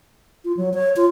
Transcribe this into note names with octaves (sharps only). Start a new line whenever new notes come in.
F4
F#3
C#5
F4